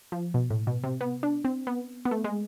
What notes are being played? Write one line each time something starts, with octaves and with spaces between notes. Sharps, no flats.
F3
B2
A2
B2
C3
B3
D4
C4
B3
B3
A3
G#3